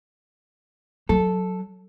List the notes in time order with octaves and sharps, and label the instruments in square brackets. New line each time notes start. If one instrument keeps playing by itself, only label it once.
[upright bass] F#3 [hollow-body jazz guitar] A4